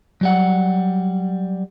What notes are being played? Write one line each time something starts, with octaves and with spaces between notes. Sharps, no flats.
F#3 G3 F#5